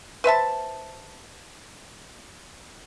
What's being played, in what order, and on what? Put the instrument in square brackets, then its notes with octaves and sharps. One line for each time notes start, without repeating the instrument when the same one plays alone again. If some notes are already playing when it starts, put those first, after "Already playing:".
[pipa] B4 C5 E5 A5